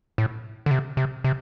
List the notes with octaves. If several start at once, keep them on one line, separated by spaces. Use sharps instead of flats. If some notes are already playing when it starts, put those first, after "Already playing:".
A2
D3
C3
C3
C3